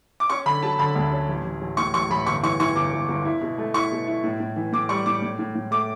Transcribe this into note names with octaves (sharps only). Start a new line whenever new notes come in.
D6
C#4 C#6
D3 B5
F#3 A5
D3 B5
D2
C#4
A1
A1
A1
A2 C#6
A1 C#6
A1 B5
G1 C#6
E3 C#6
E3 C#6
G1 D6
G1
G1
E4
B2
A3
E4 C#6
B2
E4
A2
A2
E3
A2 D6
G3 C#6
A2 D6
A2
A2
A2
A3 D6